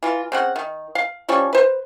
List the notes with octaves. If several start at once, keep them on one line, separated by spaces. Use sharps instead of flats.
E3 F4
C#3 C4 F#5
D#3
F5
F3 G3 C#4 C#6
B4 C5